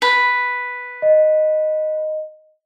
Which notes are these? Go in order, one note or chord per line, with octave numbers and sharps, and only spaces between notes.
B4
D#5